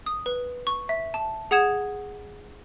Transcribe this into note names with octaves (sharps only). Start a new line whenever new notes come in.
D#6
B4
C#6
E5
A5
G#4 F#5 D#6 G#6 E7